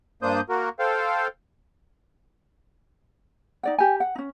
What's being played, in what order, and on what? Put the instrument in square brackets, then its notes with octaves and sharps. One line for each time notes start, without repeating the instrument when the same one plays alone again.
[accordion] G2 A#3 D4 C5 D#6 G6
A#3 F#4 A#4
A4 C5 F5 G5
[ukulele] D#4 D5 F#5
G4 G#5
F#5
C#4 D#4